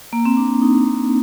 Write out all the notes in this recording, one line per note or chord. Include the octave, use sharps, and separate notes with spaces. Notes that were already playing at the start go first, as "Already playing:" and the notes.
A#3
C4
D4
D#4